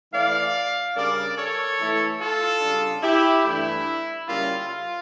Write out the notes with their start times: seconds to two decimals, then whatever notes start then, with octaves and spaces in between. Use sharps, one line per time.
0.12 E3 A3 E4 D5 F5
0.95 C#3 G3 D4 A#4 D5
1.37 A4 C#5
1.79 E3 A3 E4
2.19 F4 A4
2.61 C#3 G3 D4
3.03 E4 G4
3.44 G2 E3 A3 D4 E4
4.27 C#3 G3 A#3 C#4 E4 F4
4.69 F4